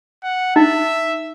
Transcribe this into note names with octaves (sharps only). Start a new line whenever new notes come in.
F#5
D#4 E5